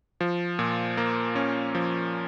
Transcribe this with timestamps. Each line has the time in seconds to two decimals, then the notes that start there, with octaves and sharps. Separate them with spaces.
0.21 F3
0.59 A#2
0.97 A#3
1.36 C#4
1.75 F3